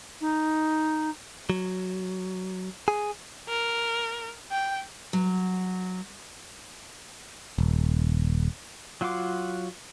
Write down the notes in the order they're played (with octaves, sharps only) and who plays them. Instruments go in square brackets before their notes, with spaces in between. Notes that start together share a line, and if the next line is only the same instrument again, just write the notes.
[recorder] D#4
[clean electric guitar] F#3
G#4
[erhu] A#4
G5
[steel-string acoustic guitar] F#3
[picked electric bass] D#1
[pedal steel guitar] F#3 F4 F#5 C6 D6